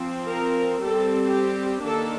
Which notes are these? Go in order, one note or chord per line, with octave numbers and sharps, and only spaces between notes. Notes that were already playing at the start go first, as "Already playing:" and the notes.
Already playing: F3 C4
A#4
G3 C4 A4
G4
D#3 A#3 D4 A4